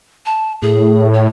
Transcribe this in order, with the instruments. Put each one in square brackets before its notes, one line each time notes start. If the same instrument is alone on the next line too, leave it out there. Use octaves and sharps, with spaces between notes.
[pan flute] A5
[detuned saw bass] A2 [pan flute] G#4
[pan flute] C#5